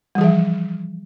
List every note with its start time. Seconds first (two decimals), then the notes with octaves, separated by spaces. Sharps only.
0.15 G3
0.18 E3
0.21 G#4
0.24 F3